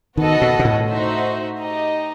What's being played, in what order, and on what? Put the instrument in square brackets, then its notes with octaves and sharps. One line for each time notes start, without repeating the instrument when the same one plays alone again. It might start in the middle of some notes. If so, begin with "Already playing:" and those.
[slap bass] D#3 [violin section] B3 F#4 A4 D#5
[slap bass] B2
B2
A2
[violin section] D#4 F#4 C5 E5
D#4 G4 D#5